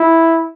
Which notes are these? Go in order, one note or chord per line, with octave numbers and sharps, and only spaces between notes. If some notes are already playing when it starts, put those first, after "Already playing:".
Already playing: E4